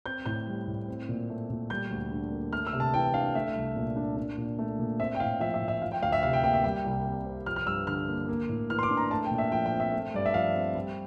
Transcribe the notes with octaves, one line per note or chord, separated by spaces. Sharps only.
C4 G6
A2 G6
G3
A2
C4
A#2
A3
A#2
G3 G6
D2
D3
A#3
A3 F6
E6
C3
A5
E3 G5
D4 F5
A3 E5
C2
A#2
D4
D4
A#2
A3
A#2
C4 E5
G5
A2 F5
F3 E5
E5
A2
E5
F3 F5
G5
D2 F5
E5
C3 F5
G5
A#3 G5
E5
G3 G5
C2
C3
C4
F3 F6
F6
G2 E6
D3 F6
A#3
A#3
A2
E3 F6
C6
D6
D4
A#5
A3 A5
G5
A#2
E5
F3 G5
G5
C4
E5
A3
G2 D5
E5
F3 F5
C4
G3